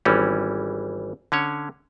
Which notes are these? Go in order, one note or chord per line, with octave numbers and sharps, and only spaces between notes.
G#1 E3 G3 C#4
D3 C#4 C#5